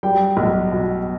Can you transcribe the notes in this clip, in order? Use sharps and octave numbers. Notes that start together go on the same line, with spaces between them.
G3 G5
B1
B2